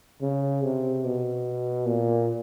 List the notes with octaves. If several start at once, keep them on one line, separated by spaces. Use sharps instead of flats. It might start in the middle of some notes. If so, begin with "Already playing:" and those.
C#3
C3
B2
A#2